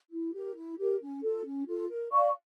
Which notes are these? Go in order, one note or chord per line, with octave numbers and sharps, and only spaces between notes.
E4
G4 A#4
E4
G4 A#4
C#4
F4 A4
C#4
F4 A4
A#4
D5 F5 C#6